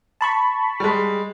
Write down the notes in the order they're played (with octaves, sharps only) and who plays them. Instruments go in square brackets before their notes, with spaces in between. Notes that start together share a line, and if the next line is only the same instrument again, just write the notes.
[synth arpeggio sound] A5 B5 C#6
[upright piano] G3 G#3